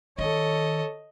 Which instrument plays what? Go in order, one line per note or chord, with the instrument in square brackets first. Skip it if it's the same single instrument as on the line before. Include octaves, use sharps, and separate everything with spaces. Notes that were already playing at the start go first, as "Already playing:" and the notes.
[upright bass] D#3 [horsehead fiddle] A4 C#5 [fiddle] D#5